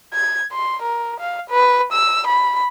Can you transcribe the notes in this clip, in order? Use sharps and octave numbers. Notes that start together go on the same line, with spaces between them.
G#6
C6
A#4
F5
B4
E6
B5